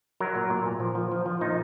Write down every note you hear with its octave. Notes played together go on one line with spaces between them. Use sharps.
F#3 A#4
A#2
A#2
A#2
F3
F3
F3
F3
A#2 D#4